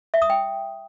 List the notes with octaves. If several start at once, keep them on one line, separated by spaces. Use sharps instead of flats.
E5
D#6
G5